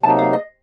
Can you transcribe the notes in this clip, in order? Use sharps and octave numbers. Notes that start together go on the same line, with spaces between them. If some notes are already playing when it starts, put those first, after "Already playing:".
C3 F#3 A#3 D#4 A5
F5
D#5